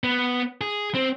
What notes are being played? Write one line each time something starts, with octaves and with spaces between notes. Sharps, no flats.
B3
G#4
C4